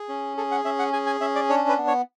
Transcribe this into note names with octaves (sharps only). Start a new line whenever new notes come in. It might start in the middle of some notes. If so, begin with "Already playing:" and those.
Already playing: G#4
C#4
G#4 A4
F#5
C#4 E5
F#5
G#4 G#5
G#5
C#4 E5
D5
D4 C#5
B4
B3
C#5